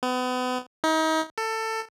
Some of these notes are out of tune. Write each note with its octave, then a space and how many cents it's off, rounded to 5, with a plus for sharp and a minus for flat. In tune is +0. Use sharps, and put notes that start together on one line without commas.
B3 +35
D#4 +35
A4 +20